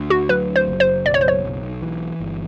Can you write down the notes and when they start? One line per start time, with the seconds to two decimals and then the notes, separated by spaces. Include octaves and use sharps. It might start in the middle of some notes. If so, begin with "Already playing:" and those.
Already playing: D2
0.10 F#4
0.29 F#3 B4
0.56 C5
0.68 F#1
0.80 C5
1.06 B1 D5
1.14 C#5
1.21 C5
1.28 C#5
1.44 B1
1.82 E3
2.20 G1